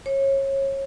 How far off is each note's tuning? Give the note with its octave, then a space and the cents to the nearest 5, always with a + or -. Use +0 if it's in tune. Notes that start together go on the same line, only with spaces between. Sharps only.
C#5 -25